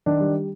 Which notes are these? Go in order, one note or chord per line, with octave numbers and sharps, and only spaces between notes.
D#3 D4
G3